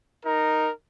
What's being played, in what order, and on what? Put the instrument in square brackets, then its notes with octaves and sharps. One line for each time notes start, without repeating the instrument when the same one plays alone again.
[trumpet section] D#4 A#4